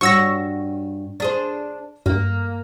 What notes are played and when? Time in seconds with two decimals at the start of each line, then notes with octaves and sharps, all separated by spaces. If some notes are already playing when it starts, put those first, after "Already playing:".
0.01 G2 F#4 C#5 C#6 E6 A#6
1.20 D4 G#4 C5
2.06 G2 A#3